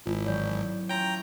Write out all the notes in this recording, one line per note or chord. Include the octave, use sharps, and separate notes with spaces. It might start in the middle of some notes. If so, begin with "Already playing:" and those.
G#1 E4 F4
A1 F#3 C#5 D5 G6
A3 C#4 F4 C#5 G5 A#5 G6 G#6